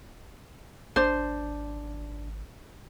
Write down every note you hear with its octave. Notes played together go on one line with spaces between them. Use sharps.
G#1 D4 C5